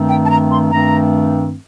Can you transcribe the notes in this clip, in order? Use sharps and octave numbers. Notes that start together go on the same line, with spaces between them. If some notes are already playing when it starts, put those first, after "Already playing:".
Already playing: G2 D#3 A3 C4
G5
A5
A#5
C6
G2 D#3 A3 C4 A#5